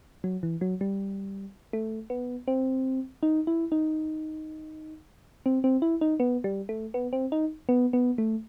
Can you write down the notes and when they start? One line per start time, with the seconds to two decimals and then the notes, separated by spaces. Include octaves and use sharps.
0.24 F#3
0.43 E3
0.61 F#3
0.81 G3
1.73 A3
2.10 B3
2.48 C4
3.23 D#4
3.47 E4
3.72 D#4
5.46 C4
5.64 C4
5.82 E4
6.01 D#4
6.20 B3
6.44 G3
6.69 A3
6.94 B3
7.13 C4
7.32 D#4
7.69 B3
7.93 B3
8.18 A3